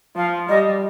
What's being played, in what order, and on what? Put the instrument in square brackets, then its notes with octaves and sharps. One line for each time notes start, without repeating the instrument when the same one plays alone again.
[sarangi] F3 [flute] F5
[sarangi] G3 [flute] D#5